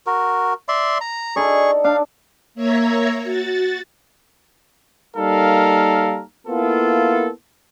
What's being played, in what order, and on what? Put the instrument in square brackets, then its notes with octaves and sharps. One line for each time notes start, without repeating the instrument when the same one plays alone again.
[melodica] F#4 A#4
D5 E5 C6
A#5
[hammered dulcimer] D#4 A4 D5 [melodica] G#4 C#6
[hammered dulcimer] D4 [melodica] F5
[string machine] A#3 C#5 E5 A#5 G#6
F#4 A6
[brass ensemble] G3 A#3 D#4 A4 A#4 F5
A#3 B3 E4 F4 A4